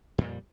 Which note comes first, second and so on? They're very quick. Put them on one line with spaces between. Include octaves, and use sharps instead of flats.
F2 A#2 G3